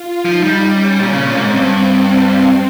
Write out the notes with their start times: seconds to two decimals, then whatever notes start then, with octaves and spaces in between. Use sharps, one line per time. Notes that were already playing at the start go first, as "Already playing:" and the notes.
Already playing: F4
0.24 F3 D#4
0.43 G3
0.61 C#4
0.99 A#2
1.12 C#3
1.24 A#2
1.36 G#2 C4
1.56 G2